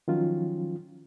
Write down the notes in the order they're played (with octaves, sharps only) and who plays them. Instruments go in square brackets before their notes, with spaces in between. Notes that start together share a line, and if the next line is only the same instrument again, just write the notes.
[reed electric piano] D#3 F3 F#3 C#4 F4